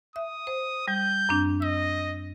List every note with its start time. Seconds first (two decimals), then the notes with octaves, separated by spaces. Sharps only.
0.16 E5 D#6
0.47 C5
0.88 G3 G6
1.29 F#2 C4 D4
1.62 D#5 E6